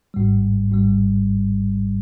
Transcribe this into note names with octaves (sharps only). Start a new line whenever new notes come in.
G#1 G#2 G3
G#1 G#2 G3